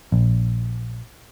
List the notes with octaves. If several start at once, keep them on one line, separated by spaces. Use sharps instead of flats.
A#1